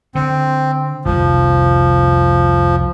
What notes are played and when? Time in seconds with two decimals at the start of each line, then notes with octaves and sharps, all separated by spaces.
0.15 D3 C4
1.05 F1 C2 D#3 F3